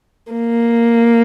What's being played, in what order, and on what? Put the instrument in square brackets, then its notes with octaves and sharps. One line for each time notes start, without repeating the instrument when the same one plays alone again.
[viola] A#3